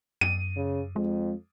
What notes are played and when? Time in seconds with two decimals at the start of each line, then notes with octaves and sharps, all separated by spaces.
0.21 F#2 D#7
0.56 C#3
0.96 F2 G#3